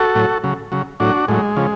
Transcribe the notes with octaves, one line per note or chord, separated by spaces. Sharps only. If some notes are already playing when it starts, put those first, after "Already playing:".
Already playing: F#4 A4
A2 F#3
C#3 F#3
C#3 F#3
A2 F#3 D4 F#4
A2 F#3 G#3
C#3 F3